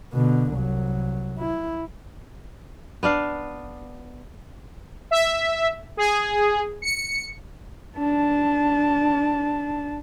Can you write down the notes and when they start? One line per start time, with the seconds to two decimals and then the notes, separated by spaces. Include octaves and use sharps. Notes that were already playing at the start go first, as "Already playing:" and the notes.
0.13 B2 D3
0.53 C2 F#3
1.39 E4
3.03 B3 D4 F5
5.11 E5
5.97 G#4
6.82 C#7
7.98 D4 A5